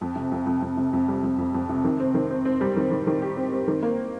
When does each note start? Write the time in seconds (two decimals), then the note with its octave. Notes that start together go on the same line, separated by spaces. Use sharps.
0.01 F2
0.16 C3
0.32 F2
0.46 F2
0.62 F2
0.77 C3
0.93 F2
1.08 G3
1.23 F2
1.38 F2
1.54 F2
1.69 C3
1.84 D#3
2.00 C4
2.14 D#3
2.30 C4
2.45 C4
2.61 G3
2.76 D#3
2.91 D#3
3.07 D#3
3.22 G4
3.37 C4
3.52 C4
3.68 D#3
3.82 A#3